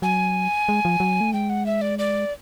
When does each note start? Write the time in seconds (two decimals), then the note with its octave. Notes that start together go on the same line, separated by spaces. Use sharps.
0.02 F#3 G#5
0.69 G#3
0.85 F3
1.00 F#3
1.21 A3
1.33 G#3 G5
1.50 F#5
1.66 E5
1.81 D5
1.99 D5